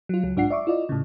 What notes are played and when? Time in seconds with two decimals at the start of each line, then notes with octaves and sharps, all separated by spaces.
0.09 F#3 F4
0.23 C#2 F#3
0.36 B1 G#2 D4 F4 F#5 C7
0.50 D5 E5 C#6 D6
0.67 E4 F4 D5 D#5
0.89 A2 C#3